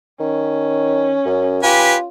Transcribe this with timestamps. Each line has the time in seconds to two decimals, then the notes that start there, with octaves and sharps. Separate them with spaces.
0.20 D#3 C#4
1.26 F#2
1.63 F4 G4 B4 G#5